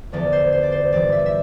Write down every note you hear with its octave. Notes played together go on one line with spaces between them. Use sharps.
E2 D3 F3 D5
C5
C5
D5
C5
G2 E3 G3 D5
E5
E5